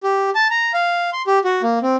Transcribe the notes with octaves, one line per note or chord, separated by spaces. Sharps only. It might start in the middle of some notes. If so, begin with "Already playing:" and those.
G4
A5
A#5
F5
C6
G4
F#4
A#3
C4